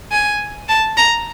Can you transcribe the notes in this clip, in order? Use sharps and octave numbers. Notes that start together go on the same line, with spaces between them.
G#5
A5
A#5